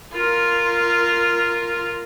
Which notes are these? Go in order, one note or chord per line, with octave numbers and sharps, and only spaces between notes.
F4 A#4